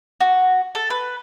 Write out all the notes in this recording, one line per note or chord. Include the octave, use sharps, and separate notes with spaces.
F#4
A4
B4